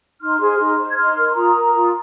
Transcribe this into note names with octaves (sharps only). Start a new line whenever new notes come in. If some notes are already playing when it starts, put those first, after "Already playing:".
D#4 C6 F6
G#4 C5
D#4
C5
G#6
D#4 C6 F6
A#4
C6
F4 A#5 D#6
A#4
F4